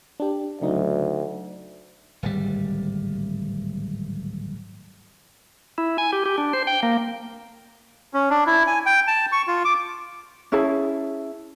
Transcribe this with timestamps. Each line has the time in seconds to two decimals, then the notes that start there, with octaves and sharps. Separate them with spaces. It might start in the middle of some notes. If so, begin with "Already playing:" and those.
0.20 D4 G4
0.61 D2 C#3 F#3 D#4
2.23 D1 G#1 G3
5.78 E4
5.98 G#5
6.13 G4
6.26 G4
6.38 D4
6.53 C5
6.67 G5
6.83 A#3
8.14 C#4
8.30 D4
8.46 E4
8.67 G#5
8.86 G5
9.07 A5
9.32 C#6
9.48 F4
9.65 D6
10.52 C#4 E4 G#4 A5